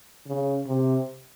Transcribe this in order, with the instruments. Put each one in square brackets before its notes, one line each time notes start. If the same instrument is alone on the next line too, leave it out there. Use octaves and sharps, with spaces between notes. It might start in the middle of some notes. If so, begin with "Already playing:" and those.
[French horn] C#3
C3